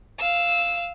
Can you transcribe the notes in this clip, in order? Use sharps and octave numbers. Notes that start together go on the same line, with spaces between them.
F5 E6